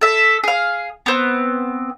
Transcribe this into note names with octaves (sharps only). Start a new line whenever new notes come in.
A4 E5
G#4 F5
B3 C4